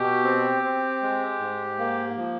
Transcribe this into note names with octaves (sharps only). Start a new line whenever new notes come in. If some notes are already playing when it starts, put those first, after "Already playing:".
Already playing: B2 G4
C4
C4
G#3
G#2
A#3
F3